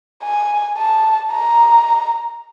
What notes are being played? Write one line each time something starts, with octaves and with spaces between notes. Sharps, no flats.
G#5
A5
A#5